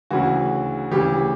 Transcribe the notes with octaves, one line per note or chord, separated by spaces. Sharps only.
D2 C#3 E3 F#4
D2 C#3 E3 G4